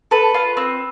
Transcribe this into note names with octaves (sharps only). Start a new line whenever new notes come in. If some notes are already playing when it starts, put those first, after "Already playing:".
A4 B4
F4
C4